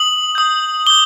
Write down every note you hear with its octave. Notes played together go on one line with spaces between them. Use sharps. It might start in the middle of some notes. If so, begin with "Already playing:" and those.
Already playing: D#6 F#7
D#6 G6
D6 G6 G7